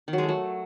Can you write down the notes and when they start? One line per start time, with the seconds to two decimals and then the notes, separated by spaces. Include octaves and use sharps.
0.08 D#3
0.13 F#3
0.18 G#3
0.23 A3
0.29 F#3